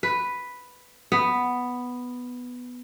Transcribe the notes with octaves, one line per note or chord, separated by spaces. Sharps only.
B4
B3